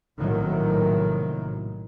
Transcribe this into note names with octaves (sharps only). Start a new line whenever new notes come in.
A#1 A2 C3 D#3 F#3